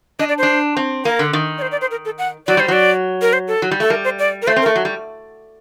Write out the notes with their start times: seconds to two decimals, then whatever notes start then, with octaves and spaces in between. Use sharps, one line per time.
0.19 D4 D#5
0.29 D5
0.38 D4 C5
0.77 C4
1.05 A#3 A#4
1.19 D3
1.33 D#3
1.58 D5
1.62 C5
1.72 D5
1.81 C5
1.91 A#4
2.05 A4
2.18 F#5
2.47 F#3 D5
2.57 G3 C5
2.68 F#3 D5
3.22 A#4
3.33 C5
3.48 A4
3.62 F#3
3.71 G3
3.80 A3 A4
3.90 G3 A#4
4.04 C5
4.19 D5
4.42 A#4
4.47 A3 C5
4.56 C4
4.62 A#4
4.66 A3
4.76 F#3
4.85 G3